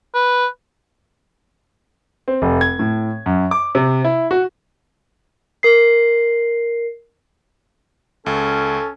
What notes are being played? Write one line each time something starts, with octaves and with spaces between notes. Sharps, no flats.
B4
C4
F1
G#6
A2
F#2
D6
C3
E4
F#4
A#4 C7
C#2 C#4 A4